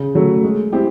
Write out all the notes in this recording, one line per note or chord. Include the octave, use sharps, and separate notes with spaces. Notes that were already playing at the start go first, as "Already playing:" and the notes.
Already playing: C#3
F#3 A3
G#3
C4 E4 G4